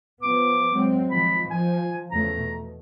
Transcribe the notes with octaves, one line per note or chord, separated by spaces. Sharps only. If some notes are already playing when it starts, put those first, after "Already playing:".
F3 B3 D6
F#3 G#3 C4
D#3 F3 B5
F3 G#5
E2 C#3 A3 A#5
B2